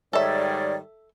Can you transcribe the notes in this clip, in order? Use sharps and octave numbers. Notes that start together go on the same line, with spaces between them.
G#2 D#3 G3 A4 C#5 D5 E5